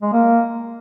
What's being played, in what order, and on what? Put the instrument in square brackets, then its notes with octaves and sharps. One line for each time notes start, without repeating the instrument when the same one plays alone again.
[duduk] G#3
A#3